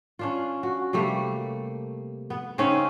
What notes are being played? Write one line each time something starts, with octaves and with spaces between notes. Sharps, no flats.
C#4 D4 F4
F#4
C3 G3 A3 A#3
B3
C#3 C4 C#4 D#4